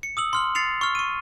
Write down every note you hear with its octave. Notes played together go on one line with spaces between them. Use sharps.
C#7
D#6 E6 F#7
C6 F6 F#7
A6 C7 C#7 F7
C#6 F6
C#6 D#7